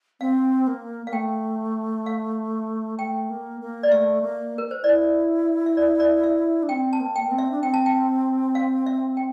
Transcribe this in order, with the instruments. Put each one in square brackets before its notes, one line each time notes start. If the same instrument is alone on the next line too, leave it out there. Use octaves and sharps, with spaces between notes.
[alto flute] C4 [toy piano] F5
[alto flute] A#3
[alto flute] A#3 [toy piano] F5
[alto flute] A3 [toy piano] G5
[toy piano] F5
[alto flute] A3 [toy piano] G5
[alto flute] A#3
A#3
[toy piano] D5
[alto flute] A3 [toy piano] E5
[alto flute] A#3
[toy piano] A#4
C5
[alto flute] E4 [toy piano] D5
[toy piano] E5
D5
D5
E5
[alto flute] D4
[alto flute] C4 [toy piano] G5
[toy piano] A5
[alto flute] A#3
[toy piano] G5
[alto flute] A#3
C4
[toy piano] E5
[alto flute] D4
[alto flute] C4 [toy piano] G5
[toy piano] A5
G5
F5
E5
G5